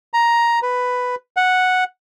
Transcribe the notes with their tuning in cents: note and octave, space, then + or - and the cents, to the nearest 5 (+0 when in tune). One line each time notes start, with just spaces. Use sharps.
A#5 +10
B4 +5
F#5 -5